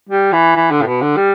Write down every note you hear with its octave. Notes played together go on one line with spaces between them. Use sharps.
G3
E3
E3
D3
A2
B2
D3
G3